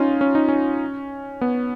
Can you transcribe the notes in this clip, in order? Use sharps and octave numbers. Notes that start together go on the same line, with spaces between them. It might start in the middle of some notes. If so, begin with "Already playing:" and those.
Already playing: C#4 D#4 F4
C#4
D#4
C#4
B3